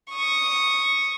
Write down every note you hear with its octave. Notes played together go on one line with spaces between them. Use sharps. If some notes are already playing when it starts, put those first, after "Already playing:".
C#6 D#6